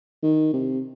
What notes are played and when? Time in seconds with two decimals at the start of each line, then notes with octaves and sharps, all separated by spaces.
0.23 D#3
0.53 C3